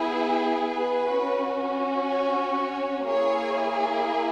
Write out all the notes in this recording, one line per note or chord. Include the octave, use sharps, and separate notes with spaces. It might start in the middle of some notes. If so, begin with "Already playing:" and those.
Already playing: B3 E4 G#4
B4
C#4 F#4
C#5
C#5
A#3 E4 G#4 C#5